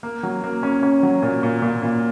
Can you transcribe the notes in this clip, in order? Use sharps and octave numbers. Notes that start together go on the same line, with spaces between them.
A#3
F#3
A#3
C#4
C#4
F#3
A#2
A#2
A#2
A#2